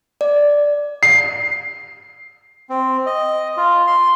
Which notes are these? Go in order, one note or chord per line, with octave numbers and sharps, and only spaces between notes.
D5
C7
C4
D#5
F4
C6